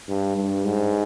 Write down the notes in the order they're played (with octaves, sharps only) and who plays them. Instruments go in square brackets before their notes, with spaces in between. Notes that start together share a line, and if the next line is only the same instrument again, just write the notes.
[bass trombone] G2
G2
G#2